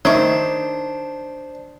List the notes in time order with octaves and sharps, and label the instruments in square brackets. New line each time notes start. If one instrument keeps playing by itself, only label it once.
[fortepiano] D#3 [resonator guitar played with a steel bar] D4 [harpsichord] C5 [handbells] C#5 E5 C#6